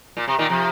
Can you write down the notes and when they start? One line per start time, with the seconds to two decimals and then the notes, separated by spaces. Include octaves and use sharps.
0.17 A#2
0.28 C3
0.39 A#2 D#3
0.50 C3 F3